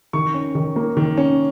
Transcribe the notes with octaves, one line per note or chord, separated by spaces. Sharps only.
D#3 C#6
C#4
D#3
A#3
D#3
C#4